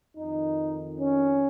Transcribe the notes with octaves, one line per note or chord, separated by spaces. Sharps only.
F2 D#3 D#4
C#4